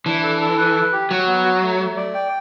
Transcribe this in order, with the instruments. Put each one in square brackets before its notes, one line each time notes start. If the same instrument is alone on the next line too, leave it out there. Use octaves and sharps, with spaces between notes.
[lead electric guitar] E3 [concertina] D4
[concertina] A4
A4
B4
B4
G4
[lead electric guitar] F#3 [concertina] F#4
[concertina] B3
F#4
A3
A3
D5
G5